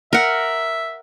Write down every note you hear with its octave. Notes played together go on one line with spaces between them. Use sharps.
A#4 E5 F#5